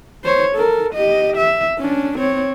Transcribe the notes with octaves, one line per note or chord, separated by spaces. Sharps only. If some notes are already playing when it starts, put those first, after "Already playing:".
C5 C#5
A4 A#4
G4 D#5
E5
C#4 D4
C4 C#5